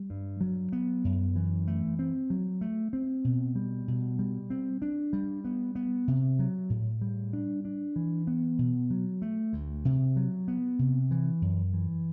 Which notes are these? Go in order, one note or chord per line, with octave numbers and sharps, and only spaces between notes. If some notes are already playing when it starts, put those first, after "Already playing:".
Already playing: G3
G2
F#3
B3
F#2
E3
A3
C4
F#3
A3
C4
B2
G3
B2
G3
C4
D4
G3
B3
B3
C3
F#3
A2
G3
D4
D4
E3
B3
B2
F#3
A3
D2
C3
F#3
B3
C3
E3
F#2
E3